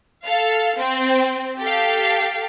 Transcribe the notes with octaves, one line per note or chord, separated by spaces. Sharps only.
A4 F5
C4
G4 A4 F5